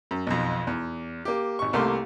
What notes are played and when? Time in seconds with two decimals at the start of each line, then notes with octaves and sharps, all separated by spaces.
0.11 F#2
0.27 B1 F2
0.67 E2
1.25 A#3 G4
1.59 G#1 C#6
1.73 C2 A3 A#3 G4 F5 C6